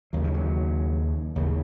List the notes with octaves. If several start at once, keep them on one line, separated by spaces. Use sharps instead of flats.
D#2 C#3 F#3
D#3
F#3
D#2 C#3